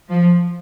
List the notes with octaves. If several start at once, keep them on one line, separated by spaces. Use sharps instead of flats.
F3